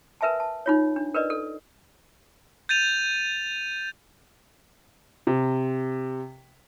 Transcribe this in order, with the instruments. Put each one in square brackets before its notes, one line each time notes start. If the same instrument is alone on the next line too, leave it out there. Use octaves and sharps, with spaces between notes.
[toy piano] A#4 B4 E5 G#5 A5
A5
D#4 F4 C#5
D4
A#4 B4 D5 D#5
A4
[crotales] G6 A6 D#7 F7
[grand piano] C3